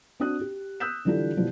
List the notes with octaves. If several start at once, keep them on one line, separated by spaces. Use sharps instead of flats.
C4 D4 F#4 D#6 F#6
G4
D#6 E6 F#6 G6 B6 E7
D3 E3 G3 D4 F4 A4
B2 E3 F3 G3